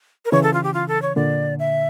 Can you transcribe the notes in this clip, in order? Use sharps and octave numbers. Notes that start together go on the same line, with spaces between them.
A#4
C#3 E3 C#5
A4
F4
G4
F4
A4
C#5
A#2 D3 D5
E5